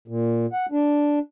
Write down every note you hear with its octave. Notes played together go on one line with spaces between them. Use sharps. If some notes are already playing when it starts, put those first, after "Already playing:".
A#2
F#5
D4